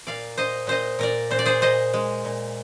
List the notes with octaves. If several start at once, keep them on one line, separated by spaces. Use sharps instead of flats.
A#2 D5 F5
A#2 C5 D#5
A#2 C5 D#5
A#2 A#4 D5
A#2 C5
D5
G#4 C5
A#2 C5 D#5
G#3
A#2